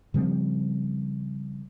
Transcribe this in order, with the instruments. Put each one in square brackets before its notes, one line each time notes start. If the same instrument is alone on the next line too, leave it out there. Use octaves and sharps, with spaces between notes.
[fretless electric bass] C#3 F3 G3 C4